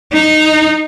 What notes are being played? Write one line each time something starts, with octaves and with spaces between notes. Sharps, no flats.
D#4